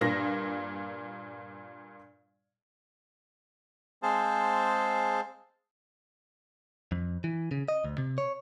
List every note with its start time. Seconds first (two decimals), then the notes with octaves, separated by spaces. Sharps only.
0.01 G2 A#2 A#6
4.03 G#3 C4 G#4 C5 F5 A5
6.92 F2
7.24 E3
7.51 C#3
7.68 D#5
7.84 D2
7.98 C3
8.18 C#5